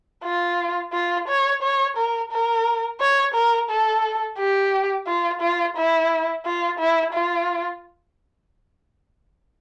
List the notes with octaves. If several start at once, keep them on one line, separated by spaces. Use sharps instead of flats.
F4
F4
C#5
C#5
A#4
A#4
C#5
A#4
A4
G4
F4
F4
E4
F4
E4
F4